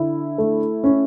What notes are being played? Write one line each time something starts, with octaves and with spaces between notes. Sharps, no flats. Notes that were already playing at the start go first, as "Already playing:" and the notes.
Already playing: D3 E4
A3
C#4